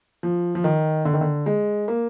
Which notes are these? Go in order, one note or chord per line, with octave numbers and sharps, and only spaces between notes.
F3
F3
D#3
D3
D#3
D3
G#3
A#3